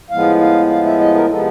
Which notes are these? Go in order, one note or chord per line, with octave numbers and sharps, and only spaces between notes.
A2 F3 G#3 B3 F5
F5
F5
E5
D#5
A#4
C3 F3 G#3 B3 A4